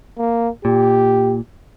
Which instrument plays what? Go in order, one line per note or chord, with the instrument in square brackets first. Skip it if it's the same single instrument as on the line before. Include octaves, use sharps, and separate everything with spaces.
[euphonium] A#3
[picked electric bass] A#2 [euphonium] G4